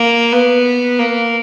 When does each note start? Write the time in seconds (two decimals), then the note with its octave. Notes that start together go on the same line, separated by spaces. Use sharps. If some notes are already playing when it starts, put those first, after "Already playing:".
Already playing: A#3
0.32 B3
0.99 A#3